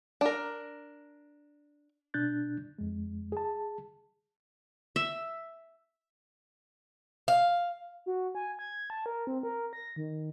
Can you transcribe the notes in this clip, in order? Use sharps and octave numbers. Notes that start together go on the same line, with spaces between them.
D4 A#4
B2 D4 F#6 G6 A6
F2 G#3
G#4 A5
E5
F5
F#4
G#5
G#6
A5
A#4
C4
A#4
A#6
D#3